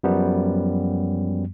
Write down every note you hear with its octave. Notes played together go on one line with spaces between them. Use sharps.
F#2 F3 G3 B3